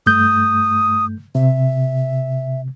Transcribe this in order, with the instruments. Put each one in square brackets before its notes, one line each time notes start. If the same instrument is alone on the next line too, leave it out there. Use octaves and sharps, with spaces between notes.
[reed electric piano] G2 A3 G6 [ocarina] D#6
[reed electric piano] C3 [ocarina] E5